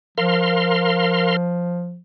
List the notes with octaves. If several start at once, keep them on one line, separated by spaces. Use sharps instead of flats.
F3 A#4 F5 C6